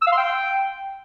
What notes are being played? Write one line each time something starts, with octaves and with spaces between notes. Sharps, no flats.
E6
F5
C6
G5